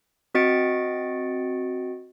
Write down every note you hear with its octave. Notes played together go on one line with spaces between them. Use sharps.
C4 F#4 D#5 A6 C#7 D7